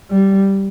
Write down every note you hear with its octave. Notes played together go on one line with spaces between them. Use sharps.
G3